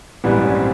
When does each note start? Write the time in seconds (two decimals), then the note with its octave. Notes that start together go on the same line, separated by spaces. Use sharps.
0.24 A#1 G#2 E3 G3 B3
0.45 C#4
0.55 C4